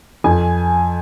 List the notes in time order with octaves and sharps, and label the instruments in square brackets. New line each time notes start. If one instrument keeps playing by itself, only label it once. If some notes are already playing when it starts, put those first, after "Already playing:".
[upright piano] F2 G#5